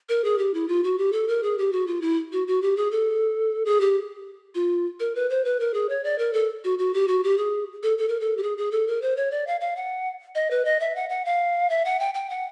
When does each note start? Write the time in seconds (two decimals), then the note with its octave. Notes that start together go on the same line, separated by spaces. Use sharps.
0.09 A#4
0.24 G#4
0.38 G4
0.54 E4
0.68 F4
0.84 F#4
0.98 G4
1.12 A4
1.28 A#4
1.43 G#4
1.58 G4
1.72 F#4
1.87 F4
2.02 E4
2.32 F#4
2.48 F#4
2.62 G4
2.77 G#4
2.91 A4
3.65 G#4
3.81 G4
4.55 F4
5.00 A#4
5.15 B4
5.30 C5
5.45 B4
5.60 A#4
5.74 G#4
5.89 C#5
6.04 D5
6.18 A#4
6.33 A4
6.64 F#4
6.79 F#4
6.94 G4
7.08 F#4
7.24 G4
7.38 G#4
7.83 A4
7.98 A4
8.08 A#4
8.20 A4
8.37 G4
8.43 G#4
8.58 G#4
8.71 A4
8.88 A#4
9.02 C5
9.17 C#5
9.31 D5
9.47 F5
9.61 F5
9.76 F#5
10.35 D#5
10.51 B4
10.65 D#5
10.80 E5
10.96 F#5
11.10 F#5
11.25 F5
11.70 E5
11.85 F#5
12.00 G5
12.14 G5
12.30 F#5